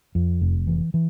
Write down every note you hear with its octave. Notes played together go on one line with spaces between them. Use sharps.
F2
F1
E3
E3